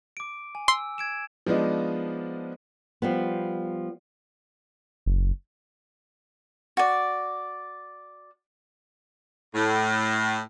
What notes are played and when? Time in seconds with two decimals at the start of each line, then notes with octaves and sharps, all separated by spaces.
0.17 D6 D7
0.55 G#5
0.68 C6 E6
0.98 G#6 D7 E7
1.46 F3 G#3 B3 D4 D#4
3.02 F3 G3 B3
5.06 F#1
6.77 F#4 D5
9.55 A2